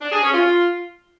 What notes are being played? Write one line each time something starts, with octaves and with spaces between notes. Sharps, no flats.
D4
G#4
C#4
F4